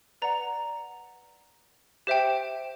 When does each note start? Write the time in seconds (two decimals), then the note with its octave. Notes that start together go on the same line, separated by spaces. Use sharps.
0.22 B4 D5 F#5 A#5
2.07 G4 C5 E5 G5